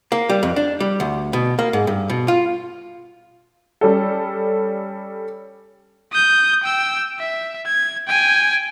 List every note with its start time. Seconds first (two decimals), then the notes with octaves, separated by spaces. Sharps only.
0.12 A#3
0.29 G3
0.43 F2
0.56 D4
0.80 G3
1.00 D2
1.33 B2
1.59 A#3
1.73 G#2
1.87 G2
2.10 B2
2.28 F4
3.81 G3 C#4 A4
6.12 D#6 G6
6.63 G5 E6
7.19 E5
7.66 G#6
8.08 G5 G#5